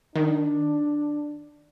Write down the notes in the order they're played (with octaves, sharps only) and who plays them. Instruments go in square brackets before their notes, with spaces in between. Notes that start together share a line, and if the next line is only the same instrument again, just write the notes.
[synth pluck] D#3 [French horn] D4